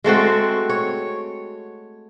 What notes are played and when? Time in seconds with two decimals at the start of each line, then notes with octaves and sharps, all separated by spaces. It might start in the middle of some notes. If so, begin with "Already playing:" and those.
0.04 G#3 A3 C4 F#4
0.69 C#5